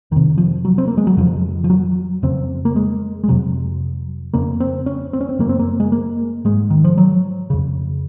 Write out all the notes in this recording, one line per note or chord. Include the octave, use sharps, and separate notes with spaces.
F2 C3 D#3
F3
F#3
C4
A#3
G#3
F#3
F2 C#3 F3
F3
F#3
F2 C#3 C4
A#3
G#3
G#3
F2 C3 F#3
F2 C#3 A#3
C4
C#4
C4
C#4
C4
F#2 C#3 A#3
C4
A#3
G#3
A#3
G#2 G#3
D#3
F3
F#3
F2 C#3